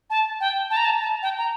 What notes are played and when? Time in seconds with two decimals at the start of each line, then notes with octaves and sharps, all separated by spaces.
0.10 A5
0.40 G5
0.70 A5
0.77 A#5
0.85 A5
1.00 A5
1.23 G5
1.38 A#5